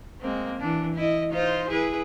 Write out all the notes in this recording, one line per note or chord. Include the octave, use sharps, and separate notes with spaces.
G#3 A#3 C4
E3 D4
E4 D#5
D#4 F4 C5
E4 G#4 B4